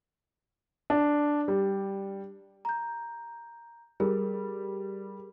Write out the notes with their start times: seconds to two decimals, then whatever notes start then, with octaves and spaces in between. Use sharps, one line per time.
0.90 D4
1.48 G3
2.65 A#5 G6
4.00 G3 G#4 A#4